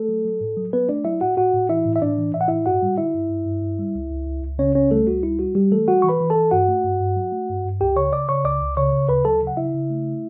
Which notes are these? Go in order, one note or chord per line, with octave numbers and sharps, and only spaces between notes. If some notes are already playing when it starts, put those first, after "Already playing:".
Already playing: A3 A4
F#3
F#3
A2
F#3
F#3 B3 B4
A3 D4 D5
F#3 E4 E5
A2 F#4 F#5
A2 F#4 F#5
A2
E3 E4 E5
A2
E5
A2 D4 D5
E3
A2 E5
F#5
A2 E4 E5
G2 F#4 F#5
G3
D3 E4 E5
G2
G2
G2
G2
G3
C#2
C#2
C#2
C#2
C#3 C#4 C#5
C#2 C#4 C#5
G3 A3 A4
C#2 F#4
G3 E4
G3 F#4
G3 G4
E3 A3 A4
G3 F#4 F#5
E3 C#6
B4 B5
E3
A4 A5
E3
G2 F#4 F#5
A3
G2
G2
F#3
A3
G2
G2
C#2 G4 G5
C#3 C#5 C#6
C#3 D5 D6
C#3 C#5 C#6
C#2 D5 D6
C#2
C#3 C#5 C#6
C#3
D2 B4 B5
F#3 A4 A5
C#3
F#5
C#3 E4 E5
C#3
A3